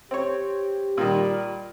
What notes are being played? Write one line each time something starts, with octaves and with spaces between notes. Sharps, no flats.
C4 G4 C#5
A#2 D#3 G3